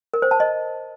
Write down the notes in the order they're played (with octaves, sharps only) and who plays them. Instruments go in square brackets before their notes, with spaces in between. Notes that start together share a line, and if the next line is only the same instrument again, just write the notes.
[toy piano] A#4
C5
A5
D#5